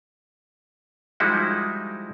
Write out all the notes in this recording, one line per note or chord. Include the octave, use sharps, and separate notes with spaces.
F3 G3 G#3 D#4 E4 F#4